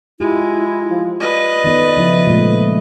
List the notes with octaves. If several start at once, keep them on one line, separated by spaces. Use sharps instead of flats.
G#3 E4 F4 G4
F3
B4 D5 D#5
D#3 B3 A4
C#3 F3 E4
A#2 G#3 A3